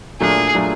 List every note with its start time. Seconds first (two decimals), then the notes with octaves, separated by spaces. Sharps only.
0.20 A#2 F#3 A3 D4 G#4
0.54 A#2 F#3 A3 D4